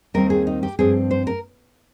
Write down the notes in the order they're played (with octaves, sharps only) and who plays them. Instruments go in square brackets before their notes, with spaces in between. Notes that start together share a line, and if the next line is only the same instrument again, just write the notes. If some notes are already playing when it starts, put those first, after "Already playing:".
[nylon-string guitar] D#2 D#3 G3 C4 A#4
G#4
D#4
G4
G2 F3 C4 G#4
C5
A#4